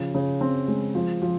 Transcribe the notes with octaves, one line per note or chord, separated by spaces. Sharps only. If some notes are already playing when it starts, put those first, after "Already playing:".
Already playing: C#3 F3
C#3
C4
G#3
F3
F3